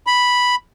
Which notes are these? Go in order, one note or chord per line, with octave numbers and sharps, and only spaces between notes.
B5